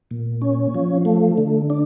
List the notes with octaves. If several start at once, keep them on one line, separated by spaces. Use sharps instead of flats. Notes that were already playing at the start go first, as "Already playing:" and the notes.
A#2
C#4
F3
A3
D3
D4